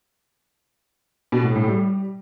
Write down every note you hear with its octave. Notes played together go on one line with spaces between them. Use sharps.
B2
A2
A2
G3